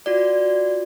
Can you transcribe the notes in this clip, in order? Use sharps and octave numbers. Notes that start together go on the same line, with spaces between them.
F4 F#4 D5